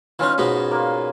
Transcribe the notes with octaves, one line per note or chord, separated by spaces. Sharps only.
E3 C#4 D#4 F4
G#2 B2 B3
A#3 F4